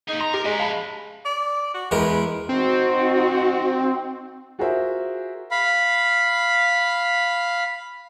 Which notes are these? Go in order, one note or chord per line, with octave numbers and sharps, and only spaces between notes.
A#3 D#4 G#4
A#5 C6
G4 A#4
G#3 C#4 D#5 E5
F5 A5 B5
D5
F#4
E2 G#3 A#4 B4
C4 D#4 F#4
F4 F#4 G#4 A#4 C5 E5
F5 B5